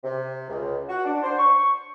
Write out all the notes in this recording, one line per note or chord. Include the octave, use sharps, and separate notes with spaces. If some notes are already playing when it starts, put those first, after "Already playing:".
C3
C#2
F#4
D4
C5
C#6